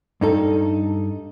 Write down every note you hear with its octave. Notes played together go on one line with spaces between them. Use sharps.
G2 D#4 A4